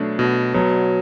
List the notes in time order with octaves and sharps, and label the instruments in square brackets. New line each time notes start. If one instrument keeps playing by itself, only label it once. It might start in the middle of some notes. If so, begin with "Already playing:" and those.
Already playing: [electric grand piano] B2 A3 D4 [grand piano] F#3
[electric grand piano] B2
[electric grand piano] B2 [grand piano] F#3